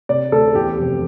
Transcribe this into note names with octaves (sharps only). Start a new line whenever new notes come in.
C3 D5
D2 A4
E2 G4
F1